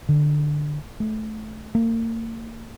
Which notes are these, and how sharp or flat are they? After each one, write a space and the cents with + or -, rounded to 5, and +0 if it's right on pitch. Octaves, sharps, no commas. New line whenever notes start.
D3 +15
A3 -20
A#3 -40